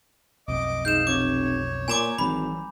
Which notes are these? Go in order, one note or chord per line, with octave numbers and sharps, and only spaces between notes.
B1 F2 A3 D#5 D6
G#2 D#5 F5 G6 E7
F1 C#5 D6
A#2 G#5 A#5 D6
G#1 E3 F#3 G3 B5